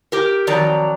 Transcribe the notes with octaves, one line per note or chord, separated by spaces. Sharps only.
G4 A#4
F2 D#3 F#3 D5 A#5